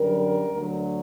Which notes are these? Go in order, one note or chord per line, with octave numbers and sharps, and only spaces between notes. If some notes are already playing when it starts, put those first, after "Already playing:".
Already playing: F#2 D3 G3 A#4
D2 D3 F#3